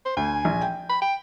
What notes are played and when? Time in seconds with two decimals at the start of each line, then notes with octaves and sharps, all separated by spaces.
0.05 C5
0.17 D2 G#5
0.45 A#1
0.61 G5
0.90 B5
1.02 G5